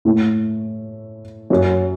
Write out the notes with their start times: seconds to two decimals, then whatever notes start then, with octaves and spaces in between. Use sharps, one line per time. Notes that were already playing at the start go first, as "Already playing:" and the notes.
0.05 A2 A3 E4
1.50 F#2 F#3 C#4